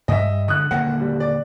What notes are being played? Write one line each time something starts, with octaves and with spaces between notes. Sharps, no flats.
G2 D#5 E5
D3 D#6 F#6
D#1 D3 A#3 F#5
G3
D5